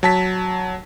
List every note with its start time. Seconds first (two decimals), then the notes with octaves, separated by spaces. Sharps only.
0.03 F#3 A5 B6